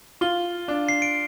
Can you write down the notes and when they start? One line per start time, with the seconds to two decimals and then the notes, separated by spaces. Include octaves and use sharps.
0.21 F4 G7
0.68 D4
0.89 C7
1.02 D7